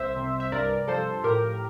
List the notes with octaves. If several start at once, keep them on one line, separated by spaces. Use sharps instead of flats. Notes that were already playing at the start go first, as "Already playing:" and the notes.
Already playing: C2 C5 E5
C3
E5
G2 A#4 D5
F3 A4 C5
A2 G4 A#4